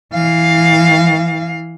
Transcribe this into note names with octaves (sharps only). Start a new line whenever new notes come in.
E3 F5